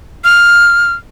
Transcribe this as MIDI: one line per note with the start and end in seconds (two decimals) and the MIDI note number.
0.24 0.93 89